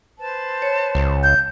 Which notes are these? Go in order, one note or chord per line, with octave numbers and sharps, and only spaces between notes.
B4 C5 A5
C#5
C#2
G6